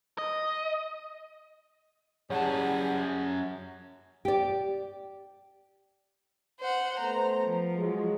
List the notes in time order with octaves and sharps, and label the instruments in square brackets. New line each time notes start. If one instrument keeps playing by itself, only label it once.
[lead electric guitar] D#5
[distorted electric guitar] F#2 A5 [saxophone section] E3 G3 G#4 [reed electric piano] C#5 F#5
[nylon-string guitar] G4 D5
[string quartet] C5 F#5
[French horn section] A3 B3 C5 [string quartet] A#5
[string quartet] F3
[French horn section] F#3 G#3